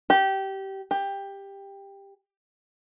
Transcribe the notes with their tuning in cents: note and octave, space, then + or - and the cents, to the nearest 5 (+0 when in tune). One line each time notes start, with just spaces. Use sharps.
G4 -20
G4 +15